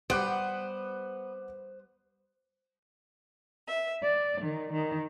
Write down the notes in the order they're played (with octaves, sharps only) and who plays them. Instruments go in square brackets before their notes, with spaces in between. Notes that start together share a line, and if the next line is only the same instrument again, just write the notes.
[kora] G3 [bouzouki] B3 [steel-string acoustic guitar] C5 [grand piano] D6 F#6 D7
[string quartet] E5
D5
D#3
D#3